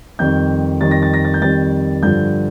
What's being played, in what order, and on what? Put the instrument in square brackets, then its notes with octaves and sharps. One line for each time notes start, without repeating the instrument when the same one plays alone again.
[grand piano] F2 D#3 G3 G6
F2 D#3 G3 A6
A#6
A6
A#6
A6
G6
F2 D#3 G3 A6
G2 D3 F3 G6